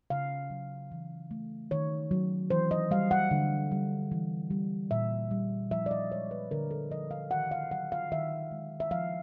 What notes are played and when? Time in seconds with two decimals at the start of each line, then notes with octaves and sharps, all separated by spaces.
0.10 C#3 F5
0.50 F#3
0.92 E3
1.31 A3
1.71 D#3 C#5
2.11 F#3
2.50 E3 C5
2.71 D#5
2.91 G3 F5
3.11 F#5
3.31 D3
3.72 G3
4.12 E3
4.51 G3
4.91 A#2 E5
5.31 G3
5.71 F3 E5
5.86 D5
5.91 D#5
6.12 G#3 C#5
6.31 B4
6.51 D3 A#4
6.71 A4
6.91 F3 D#5
7.11 F5
7.31 D#3 F#5
7.51 F5
7.71 F#3 F#5
7.92 F5
8.11 D#3 E5
8.51 G#3
8.80 E5
8.91 F3 F5